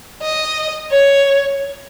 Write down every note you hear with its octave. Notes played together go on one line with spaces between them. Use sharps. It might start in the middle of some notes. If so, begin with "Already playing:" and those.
D#5
C#5